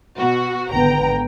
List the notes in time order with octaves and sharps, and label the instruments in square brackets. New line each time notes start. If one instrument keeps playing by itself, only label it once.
[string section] B2 F#4
[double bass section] G#1 D3 B3 [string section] G5 A#5